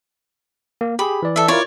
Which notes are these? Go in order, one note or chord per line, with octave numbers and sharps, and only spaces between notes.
A#3
G4 G#4 B5
E3 D5
A4 E5
E4 F4 A#4 C#5 D5